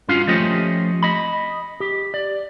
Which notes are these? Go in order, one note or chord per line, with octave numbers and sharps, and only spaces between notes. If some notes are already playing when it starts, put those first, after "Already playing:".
G2 C#4 F4 F#4 F5
F3 A3 C#4 G4 C5 D#5
D#5 B5
G4
D5